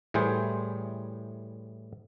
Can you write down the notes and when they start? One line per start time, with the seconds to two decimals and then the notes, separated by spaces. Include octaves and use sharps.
0.14 A2 E3 G3 G#4 C5 G5